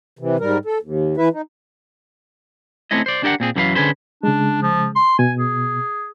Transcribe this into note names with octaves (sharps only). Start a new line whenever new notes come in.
C3 E3
G#2 G3 A#4
A4
D#2
E3 E4 B4 E5
D#4
A3 C4 C#4 E4 D#5
C5 D5
D4 G4 A#4 D#5 F#5
A#2 C4 G#4
F#2 E3 F#3 G#4 B4 F5
D3 C#4 G#4 B4 C5
C#3 G#3 D4
F3
C6
B2 G#5
G#4